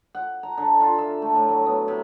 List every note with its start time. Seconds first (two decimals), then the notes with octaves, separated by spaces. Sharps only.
0.15 F#5
0.43 A#5
0.58 D3
0.81 F4
0.99 E5
1.22 A3
1.35 A2
1.49 F#3
1.66 B3
1.88 C3